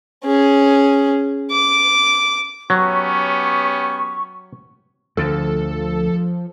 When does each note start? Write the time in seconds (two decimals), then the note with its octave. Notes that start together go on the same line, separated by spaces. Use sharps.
0.25 C#4 G#4
1.51 D6
2.70 F#3 B3 C#4 G4 C#6
5.17 D2 D3 F3 A4